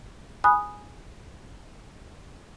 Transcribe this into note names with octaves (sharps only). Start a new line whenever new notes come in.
G#5 B5 D#6 F#6